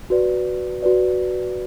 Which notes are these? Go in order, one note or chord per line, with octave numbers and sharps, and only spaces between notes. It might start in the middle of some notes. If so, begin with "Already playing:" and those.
F#4 B4 D5
F#4 B4 D5